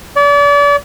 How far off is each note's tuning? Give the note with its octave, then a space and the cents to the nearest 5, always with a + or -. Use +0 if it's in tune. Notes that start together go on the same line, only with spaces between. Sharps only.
D5 -35